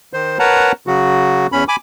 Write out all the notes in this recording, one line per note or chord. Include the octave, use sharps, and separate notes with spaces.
D#3 C5
A#4 B4 C#5 F#5 A5 A#5
C#3 F#3 F#4
E2 C#4 B5
G#5 B5 D6